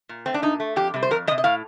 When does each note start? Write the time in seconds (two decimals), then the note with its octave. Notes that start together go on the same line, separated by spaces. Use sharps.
0.09 A#2
0.26 A3 C4
0.34 D4
0.42 A#2 D#4
0.60 A3
0.76 F2 G4
0.94 C3 G3
1.03 C5
1.11 F2 A#4
1.27 G3 D#5
1.31 C3
1.38 D#5
1.44 A2 F5